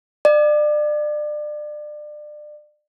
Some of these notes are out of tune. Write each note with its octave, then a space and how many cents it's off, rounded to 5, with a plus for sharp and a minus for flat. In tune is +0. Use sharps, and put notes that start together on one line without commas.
D5 +30